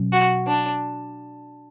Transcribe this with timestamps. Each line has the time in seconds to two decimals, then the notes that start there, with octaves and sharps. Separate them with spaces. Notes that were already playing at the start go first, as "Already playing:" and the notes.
Already playing: B2 F#3 C#4
0.12 F#4
0.47 D4